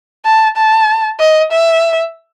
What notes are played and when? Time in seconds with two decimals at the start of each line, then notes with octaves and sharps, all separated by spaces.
0.25 A5
0.56 A5
1.20 D#5
1.52 E5